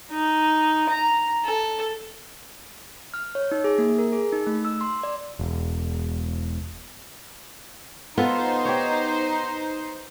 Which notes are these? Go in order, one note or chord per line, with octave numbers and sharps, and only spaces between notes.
D#4
A#5
A4
F6
C#5
D#4
G#4
A#3
A#4
G#4
D#4
A3
E6
C6
D5
E1
B3 D#4 F4 A4 C5
G4 C#5